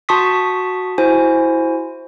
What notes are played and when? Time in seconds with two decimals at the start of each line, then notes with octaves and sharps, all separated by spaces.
0.09 F#4 A5 C6 C#6 D#6 B6
0.98 E4 F#4 C5 G#5